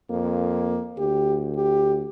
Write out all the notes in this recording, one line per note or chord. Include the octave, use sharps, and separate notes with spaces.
F2 A#3
D2 G4
G4